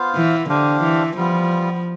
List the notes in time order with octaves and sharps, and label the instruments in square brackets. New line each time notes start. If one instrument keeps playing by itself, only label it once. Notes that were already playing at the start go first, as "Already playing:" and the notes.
Already playing: [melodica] B3 F4 C5 F5
[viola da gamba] E3
[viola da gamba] D3 [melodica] D4 G4 C5 F5
[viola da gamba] E3
[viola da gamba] F3 [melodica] G3 B3 F4